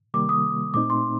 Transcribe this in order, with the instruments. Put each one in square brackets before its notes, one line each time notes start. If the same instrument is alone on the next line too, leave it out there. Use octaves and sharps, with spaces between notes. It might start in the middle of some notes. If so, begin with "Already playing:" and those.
[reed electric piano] C3 D#3 G3 A#3 [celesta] D6
[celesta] D#6
[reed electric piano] A#2 A3 C4 D#4 [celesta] D6
[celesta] C6